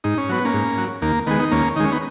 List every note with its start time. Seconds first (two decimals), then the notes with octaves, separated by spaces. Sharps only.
0.04 G#2 D#4
0.18 C#4
0.29 F#3 B3
0.45 A#3 C#4
0.54 G#2
0.78 F#3
1.02 D#2 A#3
1.27 D#3 G#3 B3
1.40 D#4
1.51 D#2 A#3 C#4
1.76 D#3 D#4
1.80 G#3 C#4
1.92 B3 D#4